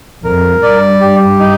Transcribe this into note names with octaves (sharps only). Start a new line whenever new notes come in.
F2 A#4
G2 D5
G4
D#4